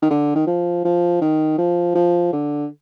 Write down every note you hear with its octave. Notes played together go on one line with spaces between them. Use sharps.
D#3
D3
D#3
F3
F3
D#3
F3
F3
D3